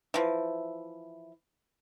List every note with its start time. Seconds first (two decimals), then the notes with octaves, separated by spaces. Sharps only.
0.14 E3 F3